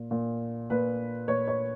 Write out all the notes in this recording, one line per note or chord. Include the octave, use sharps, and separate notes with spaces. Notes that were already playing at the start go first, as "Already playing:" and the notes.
Already playing: A#2
A#2
A#2 B4
A#2 C#5
C#5